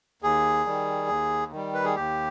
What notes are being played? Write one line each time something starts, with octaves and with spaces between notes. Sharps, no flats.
D#2 G#4
D#3 G3
D#2
D#3 G3
B4
G#4
D#2 G4